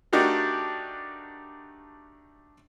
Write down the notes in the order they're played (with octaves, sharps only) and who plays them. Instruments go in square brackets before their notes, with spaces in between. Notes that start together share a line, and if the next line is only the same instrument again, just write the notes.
[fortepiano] A3 D4 D#4 F#4 G4 A#4